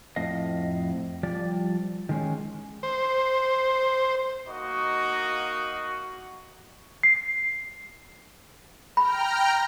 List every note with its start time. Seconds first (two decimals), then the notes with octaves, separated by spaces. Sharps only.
0.16 F2 A2 D#5 F5
1.23 F3 G3 D5
2.09 D#3 G#3 C#4
2.83 C5
4.47 A#3 D#4 F#4 D#5
7.03 C7
8.97 G5 A#5 B5 F6